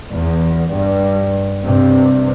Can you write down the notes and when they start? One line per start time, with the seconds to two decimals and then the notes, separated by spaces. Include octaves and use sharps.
0.11 E2
0.72 G2
1.62 G2 C3